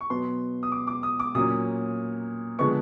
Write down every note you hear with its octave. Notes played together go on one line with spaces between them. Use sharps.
C#6
B2 F#3 B3 C6
D#6
D6
D6
D#6
D6
A#2 F#3 A#3 C#4 D#6
D3 F3 G#3 B3 C#6